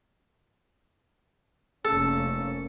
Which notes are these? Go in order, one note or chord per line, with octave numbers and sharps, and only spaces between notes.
F1 A#3 C#4 A4